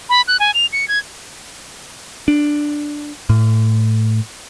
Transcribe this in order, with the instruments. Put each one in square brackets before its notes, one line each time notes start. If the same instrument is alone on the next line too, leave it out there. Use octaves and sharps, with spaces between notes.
[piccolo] B5
F#6
G#5
F7
C#7
G#6
[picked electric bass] D4
A2